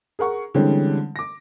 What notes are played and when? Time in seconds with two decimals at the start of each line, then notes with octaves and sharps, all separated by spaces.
0.19 G#4 A#4 F#5 C#6
0.54 D3 E3 G3 G#3 C4 C#4
1.16 D6 A#6